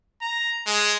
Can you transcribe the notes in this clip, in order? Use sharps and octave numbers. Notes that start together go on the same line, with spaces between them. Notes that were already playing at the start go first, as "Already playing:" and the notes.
A#5
G#3